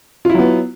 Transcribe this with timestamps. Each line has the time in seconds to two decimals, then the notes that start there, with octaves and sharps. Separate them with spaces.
0.25 F4
0.30 E4
0.34 F#3
0.39 B3